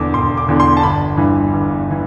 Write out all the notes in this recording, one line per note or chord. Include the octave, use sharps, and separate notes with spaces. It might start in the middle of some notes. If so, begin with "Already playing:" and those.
Already playing: E1 E2 D3 D6
E1 C6
D6
E2 D3
C6
A5
G1 B5
G2 E3
G1
E3